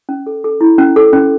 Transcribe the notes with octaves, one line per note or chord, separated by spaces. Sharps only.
C#4
A4
A4
E4
C#4
A4
C#4